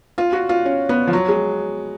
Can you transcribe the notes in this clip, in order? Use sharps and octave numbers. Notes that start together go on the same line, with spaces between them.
F4
F#4
F4
C#4
B3
F3
F#3
G#3